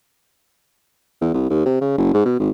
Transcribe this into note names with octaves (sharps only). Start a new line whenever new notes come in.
E2
C2
D#2
C3
C#3
F#1
G#2
B2
G#1